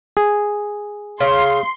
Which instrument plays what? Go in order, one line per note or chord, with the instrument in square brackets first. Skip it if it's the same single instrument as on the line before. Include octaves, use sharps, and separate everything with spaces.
[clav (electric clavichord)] G#4
[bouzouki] C#3 [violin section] C6